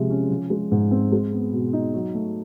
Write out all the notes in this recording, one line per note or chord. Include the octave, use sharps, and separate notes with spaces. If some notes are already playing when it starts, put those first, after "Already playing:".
Already playing: C3 F3 G#3
C#4
F3
G#3
G#2
C4
G#3
B3
B2
D#4
F#3
A3